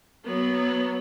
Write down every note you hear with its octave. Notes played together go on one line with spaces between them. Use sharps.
F#3 B3